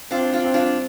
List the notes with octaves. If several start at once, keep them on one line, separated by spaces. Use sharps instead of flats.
C4 D4 F4
D4 F4
C4
D4 F4